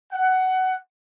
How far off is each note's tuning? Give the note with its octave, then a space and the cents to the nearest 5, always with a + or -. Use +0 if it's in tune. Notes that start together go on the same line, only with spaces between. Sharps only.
F#5 +15